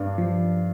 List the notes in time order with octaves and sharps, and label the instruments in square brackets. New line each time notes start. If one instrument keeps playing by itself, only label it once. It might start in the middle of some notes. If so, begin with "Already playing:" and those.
Already playing: [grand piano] G2 D4
[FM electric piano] F3